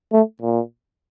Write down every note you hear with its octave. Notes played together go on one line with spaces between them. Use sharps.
A3
A#2